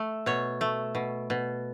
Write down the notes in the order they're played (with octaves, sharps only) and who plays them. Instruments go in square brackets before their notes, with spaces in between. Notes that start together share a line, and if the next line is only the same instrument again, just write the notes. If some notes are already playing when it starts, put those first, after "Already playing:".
Already playing: [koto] A3
B2 C#5
A3
B2
B2